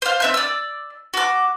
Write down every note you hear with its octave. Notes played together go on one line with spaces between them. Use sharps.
C5 F5
C4 E5 G6
D5 E6
F#4 D6